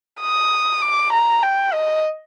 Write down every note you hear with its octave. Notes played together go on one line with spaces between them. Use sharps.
D#6
D6
A#5
G5
D#5